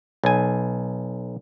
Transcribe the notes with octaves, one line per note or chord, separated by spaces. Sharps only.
B1 G#5